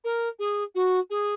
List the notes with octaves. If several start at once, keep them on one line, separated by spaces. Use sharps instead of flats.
A#4
G#4
F#4
G#4